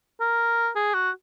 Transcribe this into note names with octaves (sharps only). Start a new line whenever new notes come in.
A#4
G#4
F#4